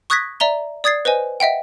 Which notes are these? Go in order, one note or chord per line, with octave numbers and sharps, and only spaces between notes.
C#6 D#6 F#6 G#6 A#6 B6
D5 E5 A#5 G7
D5 D#6 G#6 A6 C7
B4 C5 D#5 G#5
D#5 E5 F#5 G5